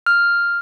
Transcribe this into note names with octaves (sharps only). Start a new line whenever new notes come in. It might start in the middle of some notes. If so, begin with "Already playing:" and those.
F6